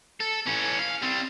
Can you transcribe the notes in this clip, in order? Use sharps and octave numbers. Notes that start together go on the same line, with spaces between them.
A4
E3 C#4
F5
G3 C4